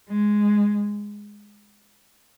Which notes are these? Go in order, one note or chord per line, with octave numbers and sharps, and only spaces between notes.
G#3